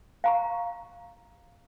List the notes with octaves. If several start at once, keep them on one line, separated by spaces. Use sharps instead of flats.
F5 A#5 C#6